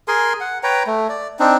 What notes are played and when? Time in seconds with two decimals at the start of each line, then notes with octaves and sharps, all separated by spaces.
0.08 G#4 A#4 G#5 C6
0.40 F#5
0.63 B4 C#5 G5 A#5
0.87 A3
1.09 D5
1.39 C4 D4 D#4